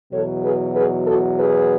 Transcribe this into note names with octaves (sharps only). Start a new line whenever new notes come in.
E2 B2 F#3 A4 C#5
G#4 B4
G#4 B4
F#4 A4
G#4 B4